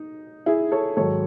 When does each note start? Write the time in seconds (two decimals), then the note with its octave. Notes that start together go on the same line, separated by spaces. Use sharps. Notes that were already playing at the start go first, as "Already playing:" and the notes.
Already playing: D#4
0.46 E4 G#4
0.72 A4 C#5
0.97 G#2 D#3 F#3 A4 C#5